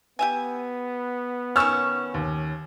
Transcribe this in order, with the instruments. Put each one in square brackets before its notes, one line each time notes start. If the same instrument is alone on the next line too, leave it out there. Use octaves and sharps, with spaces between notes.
[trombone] B3 [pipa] G4 E5 G#5
[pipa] D#3 C#4 [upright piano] C#6 E6 F6
[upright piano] D#2